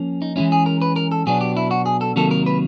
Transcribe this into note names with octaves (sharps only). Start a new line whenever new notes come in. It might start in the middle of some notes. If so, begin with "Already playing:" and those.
Already playing: F3 A#3 C#4
D#4
E3 G#3 C#4 E4
G#4
A#4
B4
A#4
A4
B2 F#3 B3 D4 G#4
G4
E4
F#4
G#4
A4
C3 D#3 F#3 A#3 A4
A#4
B4